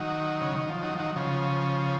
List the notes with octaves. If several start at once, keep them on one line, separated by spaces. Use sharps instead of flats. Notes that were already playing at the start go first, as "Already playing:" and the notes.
Already playing: D#3 F#3
C#3
D#3
F3
D#3 F#3
F3
D#3 F#3
C#3 F3